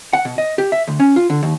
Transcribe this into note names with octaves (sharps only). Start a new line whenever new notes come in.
F#5
B2
D#5
G4
E5
D2
C#4
F4
D3
D#2